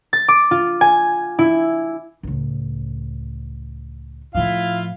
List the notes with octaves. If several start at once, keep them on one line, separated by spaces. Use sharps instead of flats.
A6
D6
F4
G#5
E4
C#2 A2
A2 F3 E4 F4 F5